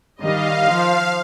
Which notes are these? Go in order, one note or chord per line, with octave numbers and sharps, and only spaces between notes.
D#3 G3 D#5 F5
F3